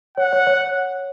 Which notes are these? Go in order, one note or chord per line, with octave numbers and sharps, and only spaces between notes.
C#5 F#5
C#5
C#5